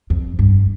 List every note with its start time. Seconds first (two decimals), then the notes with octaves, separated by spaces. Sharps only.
0.10 F2
0.39 G2